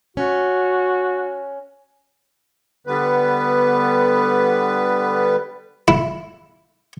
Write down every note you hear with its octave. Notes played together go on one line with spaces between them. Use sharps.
C#4 F#4
D3 G3 B3 B4
E4